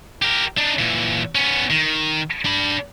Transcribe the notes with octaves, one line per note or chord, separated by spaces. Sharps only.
G4 A#4
D4 D#4
A#2 E3
B3 C#4
D#3
D4 B5